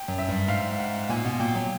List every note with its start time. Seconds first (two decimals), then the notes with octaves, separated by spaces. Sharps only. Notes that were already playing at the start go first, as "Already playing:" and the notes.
Already playing: G5
0.08 F#2 F#3
0.19 E5
0.29 G2 G3
0.48 G#2 G#3 F5
0.79 F#5
1.09 A#2 A#3 G#5
1.25 B2 B3
1.39 A#2 A#3 G5
1.55 F#3